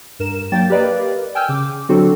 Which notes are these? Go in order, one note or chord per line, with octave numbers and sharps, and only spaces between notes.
G2 A#4 E7
F#3 A#3 D4 G5 A6
G4 A#4 B4 D5 D#5 F5
G5 G#5 E6 F6 G6
C#3 D6
D3 F#3 C4 D4 F#4 A4